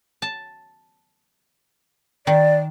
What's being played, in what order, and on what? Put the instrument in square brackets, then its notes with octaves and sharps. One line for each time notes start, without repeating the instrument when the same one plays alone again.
[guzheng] A5
[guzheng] D#3 [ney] D5